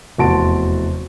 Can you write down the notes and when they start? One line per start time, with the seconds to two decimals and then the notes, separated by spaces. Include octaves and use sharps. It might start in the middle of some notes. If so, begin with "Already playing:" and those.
0.18 F1 E2 F#4 A5 C6 D7